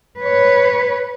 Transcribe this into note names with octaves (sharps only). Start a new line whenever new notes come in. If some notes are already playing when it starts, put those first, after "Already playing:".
B4 C#5